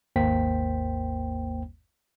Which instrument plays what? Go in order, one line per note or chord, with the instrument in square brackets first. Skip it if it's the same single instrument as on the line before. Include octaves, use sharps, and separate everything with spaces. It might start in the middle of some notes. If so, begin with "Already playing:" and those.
[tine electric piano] G#1 D#2 A#3 C5 G5 B6